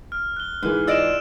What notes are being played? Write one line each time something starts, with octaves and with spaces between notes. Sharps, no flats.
F6
F#6 G7
G#2 E3 B4
F4 D5 D#5 E6 D7 E7